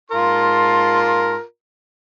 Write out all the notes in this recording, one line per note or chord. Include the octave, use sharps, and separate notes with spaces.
G#2 F4 A#4 A5 C6